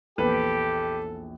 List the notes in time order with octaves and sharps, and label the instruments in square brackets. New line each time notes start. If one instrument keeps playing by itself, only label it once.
[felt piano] A#1 E2 [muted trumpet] G4 [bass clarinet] A4 [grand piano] B4